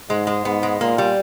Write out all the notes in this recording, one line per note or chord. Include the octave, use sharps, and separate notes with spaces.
G#2 G#3
G#3
G#2 B3
G#3
A#2 A#3
G3